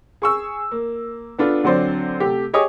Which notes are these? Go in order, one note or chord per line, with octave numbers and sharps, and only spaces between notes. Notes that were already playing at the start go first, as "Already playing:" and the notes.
G#4 C#6 E6
A#3
B3 D4 F4 A4
D3 F#3 C4 C5 D5
C3 A3 G4
G4 G#4 C#5 D#5 D6 D#6